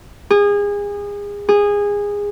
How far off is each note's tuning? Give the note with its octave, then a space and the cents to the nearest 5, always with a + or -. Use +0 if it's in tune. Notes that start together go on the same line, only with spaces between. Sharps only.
G#4 -30
G#4 -20